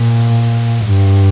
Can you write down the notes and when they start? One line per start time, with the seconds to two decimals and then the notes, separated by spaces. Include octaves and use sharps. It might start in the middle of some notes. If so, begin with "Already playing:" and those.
Already playing: A#2
0.85 G2